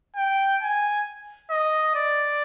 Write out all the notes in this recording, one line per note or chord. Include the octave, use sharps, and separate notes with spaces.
G5
G#5
D#5
D5